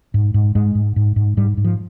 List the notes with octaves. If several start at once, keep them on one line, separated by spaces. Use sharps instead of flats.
G#2
G#2
G#2 G#3
G#2
G#2
G#2
G#2 G3
G#2
F3